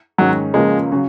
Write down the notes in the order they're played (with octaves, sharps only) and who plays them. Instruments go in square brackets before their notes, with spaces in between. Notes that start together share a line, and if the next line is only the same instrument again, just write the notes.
[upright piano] G#2 D#3 G#3 C#4 [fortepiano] F#3
[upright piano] C#2 C#3 F3 A#3 C#4 [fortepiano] G#3
[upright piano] C#3 F#3 C#4 F#4